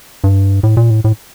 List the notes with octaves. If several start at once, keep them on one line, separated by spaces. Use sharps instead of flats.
G2
A2
A#2
A2
A2